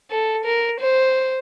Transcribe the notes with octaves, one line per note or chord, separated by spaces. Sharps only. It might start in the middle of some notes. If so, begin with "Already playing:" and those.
A4
A#4
C5